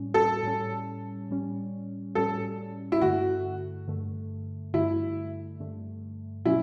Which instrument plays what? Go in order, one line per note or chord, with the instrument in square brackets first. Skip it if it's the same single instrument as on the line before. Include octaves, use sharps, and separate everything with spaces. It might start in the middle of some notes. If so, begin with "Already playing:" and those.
Already playing: [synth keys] A2 G3 C#4
[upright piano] A4
[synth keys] A2 G3 C#4
A2 G3 C#4
[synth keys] A2 G3 C#4 [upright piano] A4
[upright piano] E4
[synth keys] G2 D3 A3 [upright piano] F#4
[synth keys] G2 D3 A3
[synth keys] G2 D3 A3 [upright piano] E4
[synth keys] G2 D3 A3
[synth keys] B2 F#3 C#4 [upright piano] E4